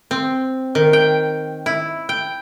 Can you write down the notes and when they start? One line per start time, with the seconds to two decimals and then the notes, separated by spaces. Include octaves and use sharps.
0.11 C4
0.75 D#3
0.93 G5
1.66 E4
2.09 G5